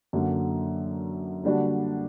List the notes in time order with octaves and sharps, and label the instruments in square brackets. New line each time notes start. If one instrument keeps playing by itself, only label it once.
[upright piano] F#2 D3 F#3 A#3
D3 G3 A#3 D4 F#4